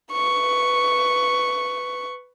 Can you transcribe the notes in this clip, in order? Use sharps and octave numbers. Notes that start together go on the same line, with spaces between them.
B4 C#6